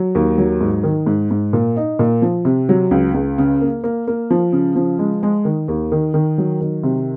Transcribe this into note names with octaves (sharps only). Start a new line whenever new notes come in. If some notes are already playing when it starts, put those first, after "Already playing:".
Already playing: F#3
D#2
F#3
G#2
D#3
G#2
G#2
A#2
D#4
A#2
F3
C3
F#3
C#2
C#2
C#3
A#3
A#3
A#3
F3
C#3
F3
G#3
G#3
D#3
D#2
D#3
D#3
F#3
D#3
C3